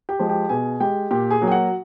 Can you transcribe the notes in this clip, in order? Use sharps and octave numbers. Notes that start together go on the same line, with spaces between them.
G4 G5
F3 G#3
G4 G5
B2 G#4 G#5
G#3 G4 G5
A#2 G4 G5
G#4 G#5
F#3 A#3
G5
F#4 F#5